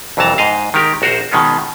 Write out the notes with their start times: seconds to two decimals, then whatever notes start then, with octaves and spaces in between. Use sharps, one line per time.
0.17 C2 F2 E3 F#3 A5 A#5
0.38 G#2 D#5 F5
0.74 D#3 G#3 G4 A#4
1.02 A#1 F#4 A#4 C5
1.31 B2 D#3 G#3 C#4 F4